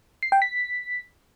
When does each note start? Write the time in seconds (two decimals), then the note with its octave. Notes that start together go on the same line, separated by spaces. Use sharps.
0.23 C7
0.32 G5
0.42 B6